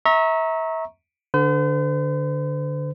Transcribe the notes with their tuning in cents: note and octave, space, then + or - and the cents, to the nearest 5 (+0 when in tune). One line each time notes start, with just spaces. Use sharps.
E5 -30 A#5 +0 C#6 -20
D3 +0 C5 -45